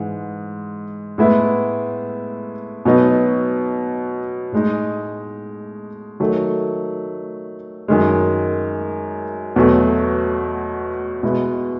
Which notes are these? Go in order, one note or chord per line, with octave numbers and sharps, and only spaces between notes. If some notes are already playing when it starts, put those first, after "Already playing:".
Already playing: G#2 E3 G#3
A2 G#3 B3 E4
B2 F#3 B3 D#4
A2 G#3 D#4
D#3 F#3 A3
F#2 D#3 G#3
E2 B2 F#3 A3
B2 G#3 B3 E4